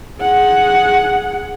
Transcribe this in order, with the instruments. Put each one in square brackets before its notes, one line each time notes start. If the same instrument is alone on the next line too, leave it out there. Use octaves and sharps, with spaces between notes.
[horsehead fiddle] G#4 F#5